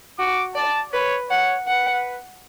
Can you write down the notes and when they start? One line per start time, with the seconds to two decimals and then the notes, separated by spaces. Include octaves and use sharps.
0.19 F#4 D6
0.55 D5 A5
0.92 B4 C#5
1.30 C#5 F#5
1.67 B4 F#5